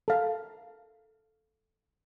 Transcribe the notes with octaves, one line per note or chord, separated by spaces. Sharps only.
A4 F5